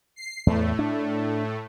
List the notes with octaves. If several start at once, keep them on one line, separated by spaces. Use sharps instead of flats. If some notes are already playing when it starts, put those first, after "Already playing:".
C7
E2 A2 A3
D4